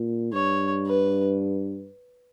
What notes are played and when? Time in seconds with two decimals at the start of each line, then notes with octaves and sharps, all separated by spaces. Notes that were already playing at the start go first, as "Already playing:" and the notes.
Already playing: A#2
0.32 G2 C#5
0.86 B4